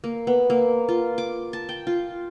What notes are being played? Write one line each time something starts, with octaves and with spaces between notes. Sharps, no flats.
A#3
B3
A#3
F4
D6
A5
G5
F4